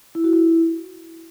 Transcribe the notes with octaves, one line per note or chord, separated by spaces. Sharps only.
E4
F#4
E4